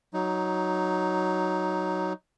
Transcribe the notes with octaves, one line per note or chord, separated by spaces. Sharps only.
F#3 D#4